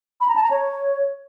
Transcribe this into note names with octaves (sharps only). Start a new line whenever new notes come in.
B5
A#5
A5
A#5
C#5